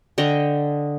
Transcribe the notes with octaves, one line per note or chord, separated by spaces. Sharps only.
D3 D#5 G5